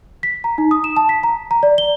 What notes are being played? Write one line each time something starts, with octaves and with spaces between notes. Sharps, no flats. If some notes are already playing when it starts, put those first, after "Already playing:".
B6
A#5
D#4
D#6
E7
A5
B6
A#5
A#5
D5
G7